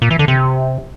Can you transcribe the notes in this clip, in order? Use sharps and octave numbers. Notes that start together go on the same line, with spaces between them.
A#2
E3
D3
C3